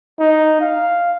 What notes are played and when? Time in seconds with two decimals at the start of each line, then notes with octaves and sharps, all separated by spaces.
0.20 D#4
0.61 F5